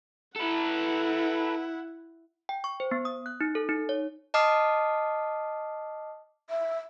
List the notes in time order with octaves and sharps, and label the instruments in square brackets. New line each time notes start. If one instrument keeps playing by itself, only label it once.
[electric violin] E4 F#5 [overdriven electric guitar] A4 B4
[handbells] G5
C#6
C5
B3
D#6
F#6
D#4
A4
D#4
C#5
[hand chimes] D#5 A5 D6 D#6 F6 C7
[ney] E5